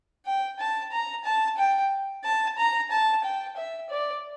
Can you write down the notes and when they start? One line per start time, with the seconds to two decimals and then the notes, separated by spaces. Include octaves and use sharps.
0.26 G5
0.59 A5
0.91 A#5
1.25 A5
1.57 G5
2.24 A5
2.57 A#5
2.91 A5
3.23 G5
3.56 E5
3.90 D5